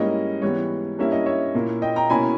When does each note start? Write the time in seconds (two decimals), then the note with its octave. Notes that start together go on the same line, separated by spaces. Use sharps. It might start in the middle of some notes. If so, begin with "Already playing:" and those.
Already playing: G#2 G3 A#3 C#4 E4 D#5
0.42 G#2 E3 G3 B3 C#5
0.98 G2 G3 A#3 C#4 E4 E5
1.12 D#5
1.26 C#5 E5
1.54 A#2 A#3 E4
1.82 D#5 G5
1.96 G5 A#5
2.10 B2 A#3 C#4 E4 G#5 B5